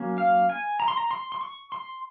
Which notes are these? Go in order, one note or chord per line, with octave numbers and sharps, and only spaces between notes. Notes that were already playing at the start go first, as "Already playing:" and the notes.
Already playing: F#3 A#3 C#4
F5
G#5
A#5
C6
A#5
C6
C6
C#6
C6